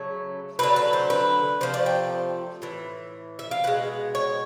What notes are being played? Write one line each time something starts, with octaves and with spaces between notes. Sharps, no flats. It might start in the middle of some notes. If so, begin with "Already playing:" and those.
Already playing: C#3 F#3 A3 C#5
D3 F#3 A3 B4
B4
C5
B4
C3 F3 A3 C5
D5
G5
A2 E3
E5
F5
B2 G#3 F#5
C#5